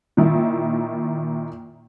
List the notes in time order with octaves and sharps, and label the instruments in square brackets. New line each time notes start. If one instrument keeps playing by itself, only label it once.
[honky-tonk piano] A#2 D#3 E4